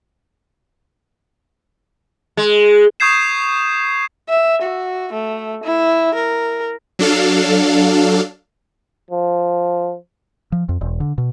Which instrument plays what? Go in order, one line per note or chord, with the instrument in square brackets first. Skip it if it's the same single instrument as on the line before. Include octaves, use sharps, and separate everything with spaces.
[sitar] G#3
[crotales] C#6 D#6 G6 G#6 C7 E7
[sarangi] E5
F#4
A3
E4
A#4
[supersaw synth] F#3 D4 A4 F5
[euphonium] F3
[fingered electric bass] F3
F2
E1
D3
B2